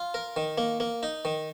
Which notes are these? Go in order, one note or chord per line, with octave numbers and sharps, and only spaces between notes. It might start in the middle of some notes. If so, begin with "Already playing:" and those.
Already playing: F4
A#4
D#3
A#3
A#3
D#4
D#3